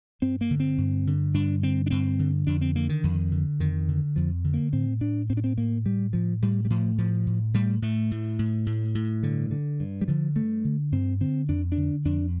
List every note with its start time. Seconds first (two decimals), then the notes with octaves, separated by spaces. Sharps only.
0.22 G2 C4
0.41 A#3
0.50 D3
0.60 C4
0.78 G2
1.07 D3
1.34 G2 D4
1.63 D3 C4
1.86 D4
1.90 G2 C4
2.19 D3
2.47 F2 D4
2.61 C4
2.75 D3 A#3
2.89 D#3
3.04 F2
3.32 D3
3.59 F2 D#3
3.88 D3
4.16 F2 F3
4.44 D3
4.54 A#3
4.73 A2 C4
5.01 A2 D4
5.29 A2 C4
5.37 D4
5.44 C4
5.57 A2 A#3
5.85 A2 G3
6.13 A2 F3
6.42 A2 G3
6.65 G3
6.70 A2 F3
6.98 A2 F3
7.27 A2
7.54 A2 G3
7.82 A2 A3
8.11 A2
8.39 A2
8.67 A2
8.95 A2
9.23 G2 D3
9.51 D3
9.80 G2
10.01 G3
10.08 D3 F3
10.36 G2 A3
10.65 D3
10.92 G2 C4
11.21 D3 C4
11.49 F2 D4
11.72 D4
11.77 D3
12.05 F2 D4